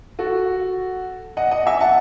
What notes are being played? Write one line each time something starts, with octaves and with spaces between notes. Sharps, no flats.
F#4 A4
D#5 F#5
D#5 F#5
E5 G#5
F#5 A5